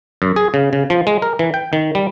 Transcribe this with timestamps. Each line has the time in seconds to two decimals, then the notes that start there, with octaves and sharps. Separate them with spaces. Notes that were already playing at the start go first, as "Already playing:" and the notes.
0.22 F#2
0.36 G#4
0.54 C#3
0.73 C#3
0.90 F3
1.07 G#3
1.22 A#4
1.39 E3
1.54 G5
1.73 D#3
1.95 G3